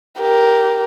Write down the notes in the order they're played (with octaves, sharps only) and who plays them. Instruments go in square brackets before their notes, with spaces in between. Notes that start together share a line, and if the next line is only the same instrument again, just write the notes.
[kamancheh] G4 A#4